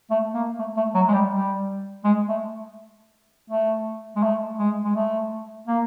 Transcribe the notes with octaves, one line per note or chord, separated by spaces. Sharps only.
A3
A#3
A3
A3
F#3
G#3
G3
G3
G#3
A3
A3
G#3
A3
G#3
G#3
A3
A#3